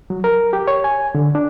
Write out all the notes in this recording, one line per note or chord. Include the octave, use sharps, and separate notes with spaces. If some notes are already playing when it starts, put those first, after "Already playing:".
F#3
A#4
G4
C#5
G#5
D3
D4